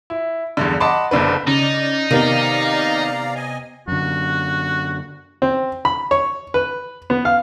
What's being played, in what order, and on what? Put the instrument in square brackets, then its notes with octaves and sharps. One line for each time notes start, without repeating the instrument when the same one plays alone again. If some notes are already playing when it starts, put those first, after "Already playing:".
[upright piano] E4
E2 G2 D3
D#5 F#5 A5 B5 C6 D6
F#1 B1 D3 D4 B4
[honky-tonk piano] C#3 [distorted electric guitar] D#4 [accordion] D5
[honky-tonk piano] C3 B3 [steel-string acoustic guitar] D#3 [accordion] D5 F5 A#5
[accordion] D#5 G#5
[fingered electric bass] F#2 D3 [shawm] F#4
[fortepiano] C4
B5
C#5
B4
B3
F5